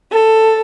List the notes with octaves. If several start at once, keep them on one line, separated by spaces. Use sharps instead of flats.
A4